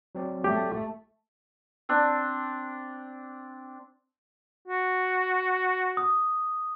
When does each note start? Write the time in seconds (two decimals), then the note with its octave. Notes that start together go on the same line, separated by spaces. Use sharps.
0.15 F#3 C4 D5
0.44 A3 G4
1.89 C4 D4
4.68 F#4
5.97 D#6